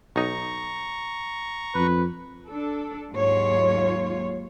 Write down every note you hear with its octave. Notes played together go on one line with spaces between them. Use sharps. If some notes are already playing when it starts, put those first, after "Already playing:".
B1 D#4 A#5 C#6
F2 B4
D4 A4
D#2 G#2 F#3 F4 C#5